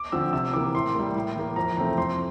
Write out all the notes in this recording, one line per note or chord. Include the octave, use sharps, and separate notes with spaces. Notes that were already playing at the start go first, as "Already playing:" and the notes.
Already playing: D6
D3 F3 C4 E6
C3 E6
E3 A#3 D6
A2 C6
G3 A#3
A2
E3 A#3
F2 A#5
C3 E3 A3 C4 A#5
F2 C6